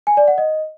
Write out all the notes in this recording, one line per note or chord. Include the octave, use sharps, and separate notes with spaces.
G#5
D5
F#5
D#5